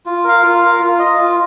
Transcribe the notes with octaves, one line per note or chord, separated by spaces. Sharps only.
F4
A#4 F5
F4
A#4 F5
F4
D#5
F4